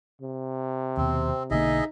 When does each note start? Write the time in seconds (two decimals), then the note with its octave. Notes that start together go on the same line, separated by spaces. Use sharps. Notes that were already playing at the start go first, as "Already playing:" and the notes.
0.22 C3
0.97 D#2 B2 C4
1.51 B1 D3 A#3 D#4 G#4 D#5 E5